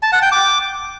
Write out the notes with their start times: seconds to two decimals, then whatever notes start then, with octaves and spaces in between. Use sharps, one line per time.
0.03 A5
0.12 F#5
0.22 G5
0.32 D6